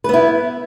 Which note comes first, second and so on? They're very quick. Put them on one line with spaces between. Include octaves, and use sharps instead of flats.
B4 B3 E4